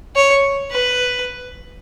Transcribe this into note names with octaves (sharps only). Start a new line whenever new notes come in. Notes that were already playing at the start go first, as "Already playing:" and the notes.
C#5
B4